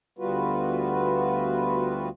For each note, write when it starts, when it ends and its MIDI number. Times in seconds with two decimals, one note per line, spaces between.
0.19 2.09 38
0.19 2.09 55
0.19 2.09 59
0.19 2.09 65
0.19 2.09 66
0.19 2.09 71